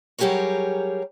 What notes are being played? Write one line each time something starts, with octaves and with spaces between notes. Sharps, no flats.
F#3 G3 G4 G#4 A#4 C#5